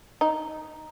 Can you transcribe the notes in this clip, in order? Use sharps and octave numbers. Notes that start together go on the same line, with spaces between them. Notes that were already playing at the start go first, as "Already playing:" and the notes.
D#4